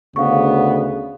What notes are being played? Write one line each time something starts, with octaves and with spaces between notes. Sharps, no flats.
D2 C#3 B3 F5 C#6